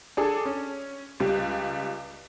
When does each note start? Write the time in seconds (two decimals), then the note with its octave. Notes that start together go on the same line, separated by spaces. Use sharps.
0.17 D4 G#4 A4
0.45 C#4
1.20 C#2 G3